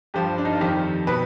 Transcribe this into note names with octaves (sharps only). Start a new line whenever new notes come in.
G2 F3 G4
D4
D#4
F4
F2 D#3 G4
B2 B4